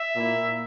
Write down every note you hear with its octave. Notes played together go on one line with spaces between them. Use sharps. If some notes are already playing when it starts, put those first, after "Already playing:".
Already playing: E5
A#2 A#3 E4